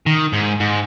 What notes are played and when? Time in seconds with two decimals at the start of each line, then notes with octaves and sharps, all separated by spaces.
0.06 D#3
0.33 G#2
0.60 G#2